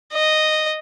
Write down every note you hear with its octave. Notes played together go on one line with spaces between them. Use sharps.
D#5